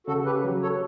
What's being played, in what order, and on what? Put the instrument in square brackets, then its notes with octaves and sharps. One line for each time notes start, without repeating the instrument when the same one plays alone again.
[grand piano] C#3 [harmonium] F#4 A4
[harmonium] G4 B4
[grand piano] F#3
[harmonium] A4 C#5